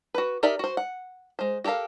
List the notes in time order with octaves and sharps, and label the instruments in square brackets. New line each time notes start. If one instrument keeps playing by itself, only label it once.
[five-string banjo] F#4 B4
D#4 G4 A#4 D5 E5
F#4 C5
F#5
G#3 C5
F#4 G4 A4 A#4 F5